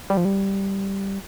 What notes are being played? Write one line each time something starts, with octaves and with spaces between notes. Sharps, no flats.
G3
F3
G3